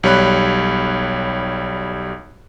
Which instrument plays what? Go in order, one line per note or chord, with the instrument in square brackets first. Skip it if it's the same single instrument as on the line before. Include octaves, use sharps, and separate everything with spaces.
[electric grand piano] B1 G3 C#5 B5 F#6